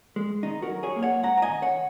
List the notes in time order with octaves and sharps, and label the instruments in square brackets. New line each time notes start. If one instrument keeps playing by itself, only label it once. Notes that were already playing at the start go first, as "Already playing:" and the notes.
[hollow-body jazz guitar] G#3
D#3 D#4
F#4 A#4
F#3
G#4 C#5
A#3
C#5 F#5
G#2 F#5 A#5
A#5
D#5 G#5
D#3
C#5 F#5